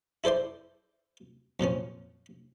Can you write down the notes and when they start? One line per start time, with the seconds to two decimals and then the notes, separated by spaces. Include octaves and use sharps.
0.24 E4 A4 C5 D5 C6
1.60 F2 A#2 F3 C#4